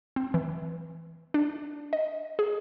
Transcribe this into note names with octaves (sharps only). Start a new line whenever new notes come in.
C4
E3
D4
D#5
G#4